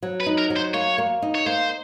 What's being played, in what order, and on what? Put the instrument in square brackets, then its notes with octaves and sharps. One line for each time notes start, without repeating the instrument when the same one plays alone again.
[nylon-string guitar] F#3
[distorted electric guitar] B4
[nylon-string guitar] D#4
[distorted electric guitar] A#4
[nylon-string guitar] F#3
[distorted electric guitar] C5
[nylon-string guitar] A#3 [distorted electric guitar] C#5
[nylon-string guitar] A#3
D#4
[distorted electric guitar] C#5
[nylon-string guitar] A#3 [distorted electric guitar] C5